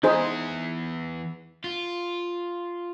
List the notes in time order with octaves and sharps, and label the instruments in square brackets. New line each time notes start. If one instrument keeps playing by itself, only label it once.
[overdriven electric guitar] E3 B3 [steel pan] D#4 G#4 C5
[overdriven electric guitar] F4